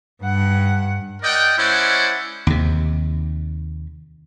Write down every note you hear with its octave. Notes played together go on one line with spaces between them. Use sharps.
G2 F#5
A#4 D5 D#5 F#5 G5
G#3 C#4 E4 C5 D5 F#5
D#2 C3